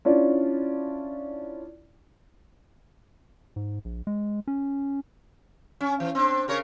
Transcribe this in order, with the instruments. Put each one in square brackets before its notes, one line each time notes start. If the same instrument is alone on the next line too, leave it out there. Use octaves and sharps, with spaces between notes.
[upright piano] C#4 D4 E4 F4 C#5 D5
[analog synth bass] G#2
A#1
G#3
C#4
[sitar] C#4
E3
C4 D4
C#3 A#4 C#5